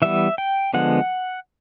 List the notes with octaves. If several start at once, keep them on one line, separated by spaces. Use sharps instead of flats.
E3 G3 B3 E5
G5
D3 F3 G#3 B3 F#5